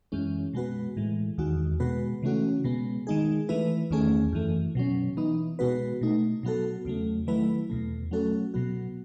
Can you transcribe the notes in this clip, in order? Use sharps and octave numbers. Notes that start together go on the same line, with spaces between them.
F#2 E3 G#3 C#4
B2 G#3 B3 F#4 B4
A2 E3 G#3
E2 D#3 G#3 D#4 F#4
B2 G#3 B3 F#4 B4
C#3 E3 A3 C#4 F#4
B2 G#3 B3
D#3 G#3 D#4 G#4
E3 A3 E4 B4
E2 D#3 A3 C#4 G#4
F#2 E3 A3
B2 F#3 C#4
E3 B3 D#4
B2 G#3 B3 F#4 B4
B2 A3 D#4
B2 F#3 B3 F#4 A4
E2 C#3 F#3 A3
D#3 F#3 A3 E4 B4
E2 B2 A3
F#3 A3 C#4 F#4 A4
B2 F#3 B3 F#4